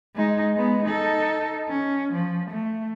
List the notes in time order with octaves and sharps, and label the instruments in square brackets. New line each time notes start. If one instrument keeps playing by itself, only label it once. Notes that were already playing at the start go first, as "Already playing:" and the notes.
[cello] G#3 D#4
G#3 B3
D#4 A4
C#4
F3
A3